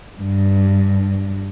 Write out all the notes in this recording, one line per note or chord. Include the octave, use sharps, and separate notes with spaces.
G2